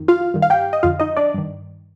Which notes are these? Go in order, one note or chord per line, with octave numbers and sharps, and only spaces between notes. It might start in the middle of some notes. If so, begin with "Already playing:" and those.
Already playing: F2 D#3
F4 F5
G2 D#3
F5
G4 G5
D#5
F2 D3 F4 F5
D#4 D#5
D4 D5
G2 D#3